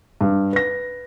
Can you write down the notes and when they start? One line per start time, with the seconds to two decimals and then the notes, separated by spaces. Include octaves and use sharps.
0.21 G2
0.53 B4 A#6